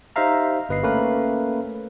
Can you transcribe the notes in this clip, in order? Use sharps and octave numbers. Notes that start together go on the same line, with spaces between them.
D#4 G4 C5 E5 F5 A#5
G1 B4 D#5 C7
A3 A#3 C#4 A#4 B4